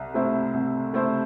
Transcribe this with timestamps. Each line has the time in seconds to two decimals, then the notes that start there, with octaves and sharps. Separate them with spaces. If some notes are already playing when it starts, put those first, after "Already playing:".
Already playing: C2
0.14 C3 A3 E4 C5
0.54 C2
0.93 C3 A3 E4 C5